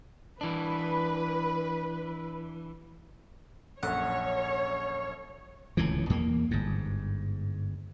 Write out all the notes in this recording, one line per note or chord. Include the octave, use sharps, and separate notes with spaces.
E3 D4 B4
A#1 F#2 A4 C#5 F#5
D1 C#2 A2 E3
E2 A#3
G1 G#2